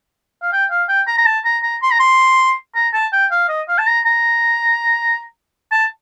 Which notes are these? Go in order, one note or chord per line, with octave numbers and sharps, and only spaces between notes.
F5
G5
F5
G5
A#5
A#5
A5
A#5
A#5
C6
A#5
C6
A#5
A5
G5
F5
D#5
F5
A5
A#5
A#5
A5